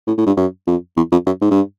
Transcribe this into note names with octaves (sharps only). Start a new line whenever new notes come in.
A2
A2
G2
F#2
F2
E2
F2
F#2
G#2
G2